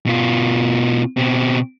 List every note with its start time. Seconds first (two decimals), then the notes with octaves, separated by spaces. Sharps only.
0.06 B2 F4
1.17 B2 C4